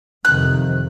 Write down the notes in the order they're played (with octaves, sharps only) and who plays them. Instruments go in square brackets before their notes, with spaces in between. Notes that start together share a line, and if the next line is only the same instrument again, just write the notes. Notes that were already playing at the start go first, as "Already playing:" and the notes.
[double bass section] F2 C3 D#3 [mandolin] F#6